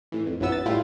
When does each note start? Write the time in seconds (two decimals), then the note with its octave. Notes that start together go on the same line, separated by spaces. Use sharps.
0.12 A2 E3
0.27 F2
0.40 A#1 F#2 E3 F#3 B3 E6
0.52 A6
0.66 A2 G3 A3 E4 F4